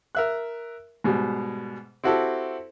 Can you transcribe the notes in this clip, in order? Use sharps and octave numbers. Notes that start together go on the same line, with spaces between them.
A#4 E5 F#6
G#2 B2 G3
C4 E4 F#4 G4 A4